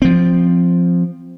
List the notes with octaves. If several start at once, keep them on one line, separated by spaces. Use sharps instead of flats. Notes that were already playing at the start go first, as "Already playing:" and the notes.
F3 C4